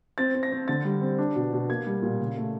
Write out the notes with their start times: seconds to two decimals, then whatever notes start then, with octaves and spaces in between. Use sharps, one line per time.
0.18 C4 A6
0.35 C4
0.43 A#6
0.52 C4
0.68 D3 A6
0.84 G3
1.01 C4
1.18 D4
1.36 B2
1.53 B2
1.69 A#3 G#6
1.87 G3
2.03 A#2
2.20 C#3
2.37 A3